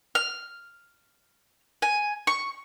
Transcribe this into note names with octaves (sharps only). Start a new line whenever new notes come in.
F6
G#5
C#6